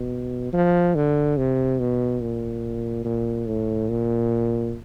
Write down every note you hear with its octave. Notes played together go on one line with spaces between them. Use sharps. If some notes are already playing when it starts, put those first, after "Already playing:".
Already playing: B2
F3
D3
C3
B2
A#2
A#2
A2
A#2